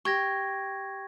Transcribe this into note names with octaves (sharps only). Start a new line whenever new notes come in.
G4 C#6 G#6 A#6